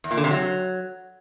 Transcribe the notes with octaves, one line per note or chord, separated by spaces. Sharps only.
E2
A#2
D3
C3
F#3